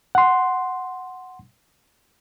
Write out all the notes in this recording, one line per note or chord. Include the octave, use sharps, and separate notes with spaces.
F#5 C6